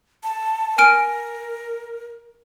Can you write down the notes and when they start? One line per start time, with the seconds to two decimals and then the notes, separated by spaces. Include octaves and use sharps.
0.24 A5
0.78 A#4 G#5 F6 D7